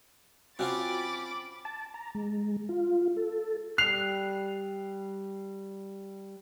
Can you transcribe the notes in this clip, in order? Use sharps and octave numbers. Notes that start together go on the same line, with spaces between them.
C4 C#4 F4 F#4 G5 B5 D6 A6
A5
A#5
G#3
F4
A4
G3 F#6 C7 F7